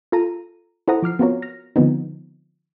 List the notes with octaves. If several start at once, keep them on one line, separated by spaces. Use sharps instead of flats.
F4 A4 A#5 D#7
E4 A4 C5 F#5 A#5 D#6
F3 D6 F6 C7
B3 C4 F4 F#4 A#4 C#5
F6 A#6
D3 F3 G#3 B3 C4 D#4